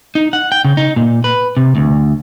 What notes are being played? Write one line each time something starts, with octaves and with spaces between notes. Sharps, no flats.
D#4
F#5
G5
C#3
D#4
A#2
B4
C3
D2